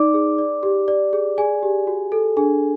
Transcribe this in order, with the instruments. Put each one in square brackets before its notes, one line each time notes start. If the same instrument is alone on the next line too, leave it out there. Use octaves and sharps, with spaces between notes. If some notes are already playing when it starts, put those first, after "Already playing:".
Already playing: [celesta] D#4 D5 D6
G#4
D5
G4
D5
G#4
G#4 D5 G#5
G4
F#4
A4
D4 G#4 G#5